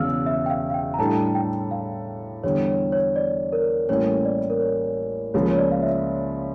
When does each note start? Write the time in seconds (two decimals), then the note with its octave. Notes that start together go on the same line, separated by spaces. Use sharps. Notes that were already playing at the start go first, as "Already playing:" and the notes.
Already playing: E1 E2 C#3 F5 E6 F6
0.26 E5
0.46 G5
0.50 F5
0.70 F5
0.74 G5
0.94 A#5
0.98 A2 G3 D4 A4 A5
1.35 G5
1.71 F5
2.43 E2 D3 G3 C#5
2.68 C#5
2.92 C#5
3.16 D5
3.53 A#4
3.89 A1 A2 G3 A#3 C#4 C#5
4.25 D5
4.50 A#4
4.61 C#5
5.34 C#2 C#3 F3 A#3 C#5
5.50 C#5
5.58 D5
5.72 F5
5.82 E5